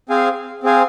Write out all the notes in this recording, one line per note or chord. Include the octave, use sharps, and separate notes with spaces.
C4 G#4 C5 F5 G#5
C4 G#4 C5 F5 G#5